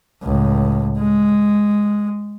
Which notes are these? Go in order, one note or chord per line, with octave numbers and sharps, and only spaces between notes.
C#2 A2
G#3